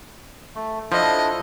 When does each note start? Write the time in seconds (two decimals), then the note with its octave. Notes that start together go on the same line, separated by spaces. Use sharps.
0.56 A3
0.92 F3 D4 E4 A4 D#5